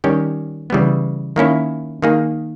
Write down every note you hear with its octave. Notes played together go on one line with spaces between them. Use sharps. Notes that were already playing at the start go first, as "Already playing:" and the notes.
D#3 G3 C#4 G4
C#3 E3 G3 B3
D#3 A#3 C#4 E4
D#3 A#3 D#4 G#4